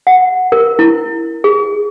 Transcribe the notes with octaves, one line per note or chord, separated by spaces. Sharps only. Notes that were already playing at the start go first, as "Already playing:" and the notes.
F#5
A#4
E4
G#4